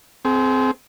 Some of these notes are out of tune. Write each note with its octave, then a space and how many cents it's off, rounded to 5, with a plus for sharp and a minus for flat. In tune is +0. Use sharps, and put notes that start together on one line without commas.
C4 -10 G#4 +35